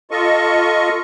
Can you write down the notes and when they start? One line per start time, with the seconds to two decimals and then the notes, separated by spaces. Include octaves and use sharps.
0.11 F4 A4 D#5 C#6